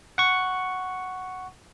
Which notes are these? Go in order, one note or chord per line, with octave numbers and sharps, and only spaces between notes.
F#5 C#6